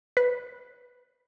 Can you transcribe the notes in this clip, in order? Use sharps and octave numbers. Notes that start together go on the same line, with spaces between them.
B4